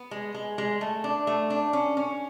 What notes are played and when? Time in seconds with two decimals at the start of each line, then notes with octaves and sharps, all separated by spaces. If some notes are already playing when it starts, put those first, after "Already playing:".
Already playing: B3
0.11 G#3
0.34 G#3
0.58 G#3
0.81 A3
1.04 D4
1.27 A3
1.50 D4
1.73 C#4
1.97 C#4